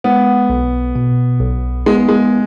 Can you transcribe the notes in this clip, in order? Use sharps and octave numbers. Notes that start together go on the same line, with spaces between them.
G#3 B3
B1
B2
B1
G#3 B3
G#3